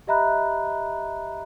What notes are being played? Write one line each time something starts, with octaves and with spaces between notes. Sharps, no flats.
G4 D#5 E5 A#5 B5 F#6